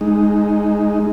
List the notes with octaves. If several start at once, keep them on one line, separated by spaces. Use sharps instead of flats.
G#3 D#4